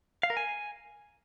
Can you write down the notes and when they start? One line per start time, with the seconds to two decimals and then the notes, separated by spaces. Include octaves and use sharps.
0.23 F5
0.30 A#4
0.37 G#5